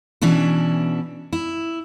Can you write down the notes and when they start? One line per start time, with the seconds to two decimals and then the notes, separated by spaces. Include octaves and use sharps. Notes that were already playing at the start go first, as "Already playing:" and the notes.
0.22 B2 E3 C#4 D4 E4
1.33 E4